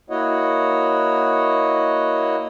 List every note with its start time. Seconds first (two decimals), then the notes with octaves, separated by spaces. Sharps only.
0.10 A#3 E4 F#4 C#5 D#5 F#5